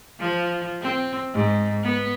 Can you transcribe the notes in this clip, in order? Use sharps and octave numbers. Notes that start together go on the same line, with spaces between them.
F3
C4
G#2
B3